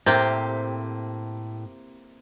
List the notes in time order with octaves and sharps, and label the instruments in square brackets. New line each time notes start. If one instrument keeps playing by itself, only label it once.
[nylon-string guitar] A2 [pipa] C3 [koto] A#3 C4 G4